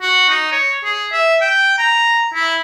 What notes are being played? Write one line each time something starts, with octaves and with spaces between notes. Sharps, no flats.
F#4
D#4
C#5
G#4
E5
G5
A#5
E4